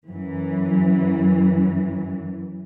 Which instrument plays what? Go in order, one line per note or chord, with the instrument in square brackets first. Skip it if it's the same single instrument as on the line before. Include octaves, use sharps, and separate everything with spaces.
[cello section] F#2 E3